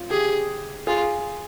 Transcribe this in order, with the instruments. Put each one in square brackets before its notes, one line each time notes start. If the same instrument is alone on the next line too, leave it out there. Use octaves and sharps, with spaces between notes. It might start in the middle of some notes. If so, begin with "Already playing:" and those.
Already playing: [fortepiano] F4
[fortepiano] G4 [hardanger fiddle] G#4
[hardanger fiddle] F4 [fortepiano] G#4